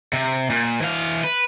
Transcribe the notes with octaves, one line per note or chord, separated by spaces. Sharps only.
C3
A#2
E3 F5
B4